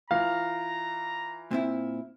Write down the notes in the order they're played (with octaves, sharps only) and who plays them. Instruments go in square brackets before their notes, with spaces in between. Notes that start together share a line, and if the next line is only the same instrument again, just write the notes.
[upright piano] E3 F4 [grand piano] F5 [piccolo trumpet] A#5
[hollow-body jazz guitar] A#2 C4 E4